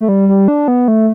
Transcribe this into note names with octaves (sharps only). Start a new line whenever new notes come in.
A3
G3
G3
D4
B3
A3